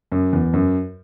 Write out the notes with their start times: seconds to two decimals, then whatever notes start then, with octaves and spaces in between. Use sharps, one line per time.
0.12 F#2
0.33 E2
0.53 F#2